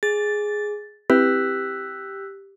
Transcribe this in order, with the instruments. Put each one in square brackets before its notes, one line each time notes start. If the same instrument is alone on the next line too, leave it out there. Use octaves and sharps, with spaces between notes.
[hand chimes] G#4 [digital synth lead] A6
[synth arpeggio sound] C4 E4 B4 [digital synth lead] G4 [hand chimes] E6 F#6 B6